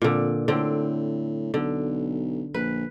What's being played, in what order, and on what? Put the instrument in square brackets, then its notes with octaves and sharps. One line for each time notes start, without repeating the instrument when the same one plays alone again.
[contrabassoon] F2 [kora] A#2 D3
[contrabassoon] A2 [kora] D3 C4
[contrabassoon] B1 [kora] D3
[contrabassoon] A#1 [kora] B4